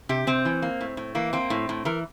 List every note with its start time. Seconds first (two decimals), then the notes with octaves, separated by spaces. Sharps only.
0.09 C3 G4
0.27 C3 C4
0.45 E3
0.62 A#3
0.81 A2
0.97 A2
1.15 E3 A#3
1.33 A#3 C4
1.50 A2
1.69 A2
1.85 E3 A#4